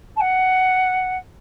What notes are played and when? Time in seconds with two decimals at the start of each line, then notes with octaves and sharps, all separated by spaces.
0.16 A5
0.20 F#5